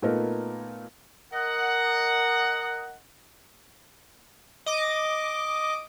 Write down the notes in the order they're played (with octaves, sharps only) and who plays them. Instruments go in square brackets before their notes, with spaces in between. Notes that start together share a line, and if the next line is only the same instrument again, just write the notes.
[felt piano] A#2 A3 B3 D#4 A#4
[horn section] A#4 D#5 F#5
[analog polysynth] D#5 D6